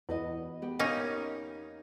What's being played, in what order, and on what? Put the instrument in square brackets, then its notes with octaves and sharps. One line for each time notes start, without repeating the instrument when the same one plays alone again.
[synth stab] E2 [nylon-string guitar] F#4 B4 D#5
[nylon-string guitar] B3 G4
[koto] A#3 C#4 D#4